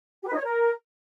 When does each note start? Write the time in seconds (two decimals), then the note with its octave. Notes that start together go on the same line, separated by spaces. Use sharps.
0.23 G4
0.28 B4
0.33 D#4
0.38 C#5
0.43 A#4